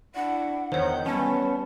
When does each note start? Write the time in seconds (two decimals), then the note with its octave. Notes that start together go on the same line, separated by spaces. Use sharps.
0.15 D4 E4 F#5
0.72 E2 D#3 C5 C#5 F#5 G6
1.06 G3 B3 C#4 A5